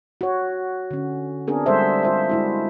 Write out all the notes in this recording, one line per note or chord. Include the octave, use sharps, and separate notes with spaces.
F#4 C#5
D3 C#4
B3 C4 D4 G#4 A#4
G3 G#3 A4 C5 E5
F4 C5 E5
G#3 E4 F#4